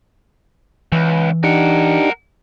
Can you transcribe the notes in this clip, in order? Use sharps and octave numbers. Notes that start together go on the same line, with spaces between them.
C#2 E3 B4
D4 D#4 G4 A#4 F#5